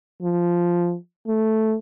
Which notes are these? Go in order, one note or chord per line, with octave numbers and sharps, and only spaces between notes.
F3
A3